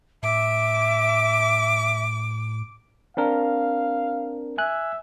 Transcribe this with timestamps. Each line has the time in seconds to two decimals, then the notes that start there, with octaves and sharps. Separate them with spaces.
0.23 A2 E5 D6
3.17 C4 D4 A#4 F5
4.58 E5 G#5 F#6